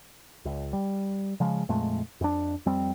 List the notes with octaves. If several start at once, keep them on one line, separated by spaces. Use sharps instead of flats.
C#2
G3
C#3 F3 G#3
F2 A#2 G#3 A3
F2 D4
F2 G3 C4